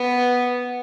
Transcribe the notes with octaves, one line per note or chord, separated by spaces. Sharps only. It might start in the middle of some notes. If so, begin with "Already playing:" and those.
Already playing: B3